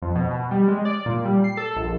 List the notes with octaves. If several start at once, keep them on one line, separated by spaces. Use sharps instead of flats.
F2
B2
B2
G3
G#3
D5
A#2
G3
C7
A4
A#1